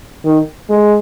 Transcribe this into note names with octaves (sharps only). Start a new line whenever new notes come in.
D#3
G#3